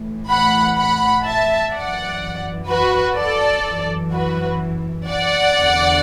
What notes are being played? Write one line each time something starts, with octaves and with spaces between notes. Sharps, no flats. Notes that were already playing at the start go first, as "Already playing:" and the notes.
Already playing: A2 E3
F#5 B5
F#5 B5
E5 A5
F#2 E3 D5 F#5
F#4 B4
A4 D5
F#2 E3
F#4 B4
D5 F#5
E2 D3